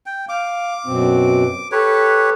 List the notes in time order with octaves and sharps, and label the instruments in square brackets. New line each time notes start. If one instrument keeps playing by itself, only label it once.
[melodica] G5
[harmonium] F5 [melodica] D6
[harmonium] F#2 B2 C4
[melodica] G4 B4 C#5 [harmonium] A4